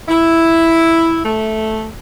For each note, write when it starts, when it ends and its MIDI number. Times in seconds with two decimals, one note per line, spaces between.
0.09 1.21 64
1.25 1.88 57